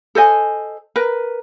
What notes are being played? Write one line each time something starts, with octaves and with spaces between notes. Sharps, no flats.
A4 C5 D#5 G#5
A#4 B4